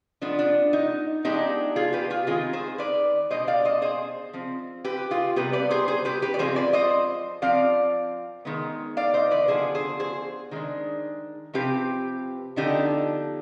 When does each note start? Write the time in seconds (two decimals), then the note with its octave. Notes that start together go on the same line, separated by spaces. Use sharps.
0.21 F3 G#3 B3 D4
0.39 D4
0.73 D#4
1.24 F3 G#3 B3 D4 D#4 G4
1.76 F4 G#4
1.93 G4 B4
2.10 F4 G#4
2.27 D#3 G#3 C4 F4 G#4
2.53 G#4 C5
2.78 B4 D5
3.30 B2 G#3 D4 C5 D#5
3.48 D5 F5
3.65 C5 D#5
3.82 G#4 C5
4.33 F3 C4
4.84 G4 B4
5.11 F4 G#4
5.36 C3 G3 B3 G4 B4
5.53 B4 D5
5.70 G#4 C5
5.88 G#4 C5
6.05 G4 B4
6.22 G4 B4
6.34 D5
6.39 F3 G#3 C4 G#4 C5
6.56 B4 D5
6.73 C5 D#5
7.42 F3 C4 D5 F5
8.45 D#3 G#3 B3
8.97 D5 F5
9.14 C5 D#5
9.31 B4 D5
9.48 D3 F3 B3 D4 G#4 C5
9.75 G#4 C5
10.00 G#4 C5
10.51 D#3 G#3 D4
11.54 C3 F3 C4 G4 B4
12.56 D3 F3 B3 D4 D#4 G4